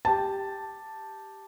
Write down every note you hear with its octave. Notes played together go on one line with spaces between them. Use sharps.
G4 A5